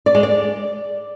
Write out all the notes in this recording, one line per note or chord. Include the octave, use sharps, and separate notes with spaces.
D5
G#3
D5